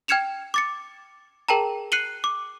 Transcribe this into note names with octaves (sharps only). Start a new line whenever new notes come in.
G5 F6 G#6 C#7 E7 F7
D6 A6 C#7
G#4 A#4 G5 A5 A#5
F#6 C7 C#7 D#7 F#7 G7
D6